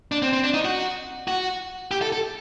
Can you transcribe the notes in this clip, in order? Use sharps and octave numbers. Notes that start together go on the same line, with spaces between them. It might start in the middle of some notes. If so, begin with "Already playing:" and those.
D4
C4
C4
D4
D#4
F#4
F#4
G4
A4
A4